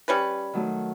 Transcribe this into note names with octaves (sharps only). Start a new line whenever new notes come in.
G3 C#4 B4
D#3 F#3 A3